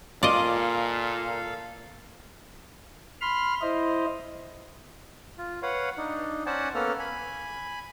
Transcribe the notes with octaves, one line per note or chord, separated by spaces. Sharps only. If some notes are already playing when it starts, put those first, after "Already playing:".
A#2 F4 A4 D5 D#5 F5
B5 C6 F6
E4 C5 D#5
F4
B4 C#5 F5 F#5
D4 D#4
C#4 C5 D5 F#5 G#5 A5
A#3 B3 C#4 A4 F6
G#5 B5